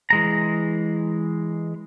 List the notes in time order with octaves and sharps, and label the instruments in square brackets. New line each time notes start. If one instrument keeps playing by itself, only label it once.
[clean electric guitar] E3 G#3 A#5